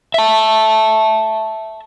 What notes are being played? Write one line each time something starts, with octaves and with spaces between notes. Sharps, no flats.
E5 A5